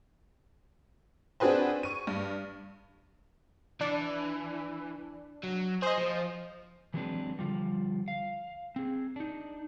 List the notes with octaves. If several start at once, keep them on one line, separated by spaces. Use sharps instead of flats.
C4 D4 F#4 G#4 B4 C5
C#6 D#7
G2
E3 D4
F#3
G#4 C5 D#5
F3
E3 F#3 G#3 C4 D4 B4
D3 F3 G3
F5
C4 G#4
D4 D#4